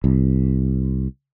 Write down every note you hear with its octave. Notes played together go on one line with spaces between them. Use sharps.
C2